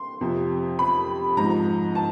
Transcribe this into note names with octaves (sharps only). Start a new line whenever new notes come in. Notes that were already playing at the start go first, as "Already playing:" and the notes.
Already playing: C6
F2 C3 F3
B5
G#2 F3 A#5
A5